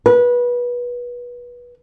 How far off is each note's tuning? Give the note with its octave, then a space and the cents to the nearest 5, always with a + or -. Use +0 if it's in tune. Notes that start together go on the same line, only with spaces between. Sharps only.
B4 -25